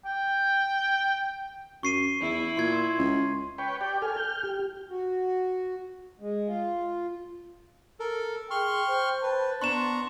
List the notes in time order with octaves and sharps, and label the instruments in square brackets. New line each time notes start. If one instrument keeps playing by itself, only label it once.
[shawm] G5
[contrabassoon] F#2 [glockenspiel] C#6 C7 D#7
[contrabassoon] E2 [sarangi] E4
[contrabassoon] A#2 [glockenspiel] C6 G#6
[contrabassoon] C#2
[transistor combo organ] B4 C#5 G5
G4 D5 G5
[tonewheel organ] A4 G#5 [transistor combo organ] F6
[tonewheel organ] G6
G4
[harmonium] F#4
G#3
F4
[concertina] A4 A#4
[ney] G#4 [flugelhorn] G5 [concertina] C6 C#6 F6
[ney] C5
[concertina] B4 [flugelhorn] A5
[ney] B3 [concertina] D4 A#5 C#6 [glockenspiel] C6 E7